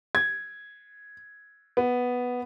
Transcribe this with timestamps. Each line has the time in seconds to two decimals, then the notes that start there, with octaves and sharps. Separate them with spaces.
0.15 G#6
1.77 B3